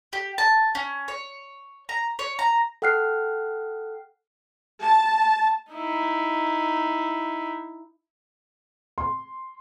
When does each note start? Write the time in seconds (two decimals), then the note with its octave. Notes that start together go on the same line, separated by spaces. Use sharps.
0.13 G4
0.38 A5
0.75 C#4
1.08 C#5
1.89 A#5
2.19 C#5
2.39 A#5
2.82 A4 F#5 G5 F6 F#6 C7
4.82 A5
5.71 D#4 E4
8.98 C6